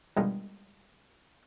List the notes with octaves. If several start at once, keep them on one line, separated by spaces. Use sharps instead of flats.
D#3 G3 G#3 B3 D4 F4